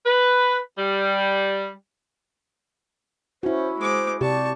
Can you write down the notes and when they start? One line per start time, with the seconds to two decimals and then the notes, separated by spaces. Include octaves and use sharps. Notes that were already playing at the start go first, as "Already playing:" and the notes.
0.06 B4
0.79 G3
3.43 C#4 E4 F#4 C5
3.79 G#3 C5 D6
4.21 C3 G4 D5 A5 C#6